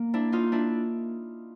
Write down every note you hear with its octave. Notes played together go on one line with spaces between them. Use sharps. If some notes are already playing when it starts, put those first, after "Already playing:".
Already playing: A#3
D4 E4
D#4 F4
D4 E4